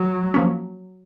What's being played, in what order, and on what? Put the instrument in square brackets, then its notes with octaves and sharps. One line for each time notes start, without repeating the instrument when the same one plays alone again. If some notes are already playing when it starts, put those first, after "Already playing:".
Already playing: [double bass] F#3
[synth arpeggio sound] F3 A#3 C#4